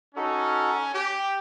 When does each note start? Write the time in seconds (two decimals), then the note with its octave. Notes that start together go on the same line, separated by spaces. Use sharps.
0.15 C#4 D#4 F#4 A4
0.94 G4